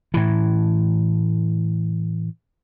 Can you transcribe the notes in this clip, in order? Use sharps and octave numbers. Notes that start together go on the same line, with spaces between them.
A2 E3